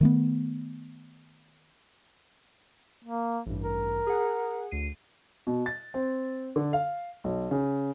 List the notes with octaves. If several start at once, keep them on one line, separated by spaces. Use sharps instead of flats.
D#3 A3 B3
A#3
A1 G2
A#4
G#4 F#5
D2 C7 D#7
B2
A6
C4
D3
F5
B1
C#3